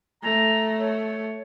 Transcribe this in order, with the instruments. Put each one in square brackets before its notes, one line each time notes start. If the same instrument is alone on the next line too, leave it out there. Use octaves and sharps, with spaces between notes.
[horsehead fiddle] A3 [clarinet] A#5
[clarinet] C#5